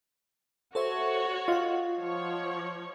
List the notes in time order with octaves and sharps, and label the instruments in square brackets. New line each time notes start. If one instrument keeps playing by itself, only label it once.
[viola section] F#4 C#5 [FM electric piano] A4 C5 E5
[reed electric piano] F4 [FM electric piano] D#5 F#5
[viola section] F3 C#5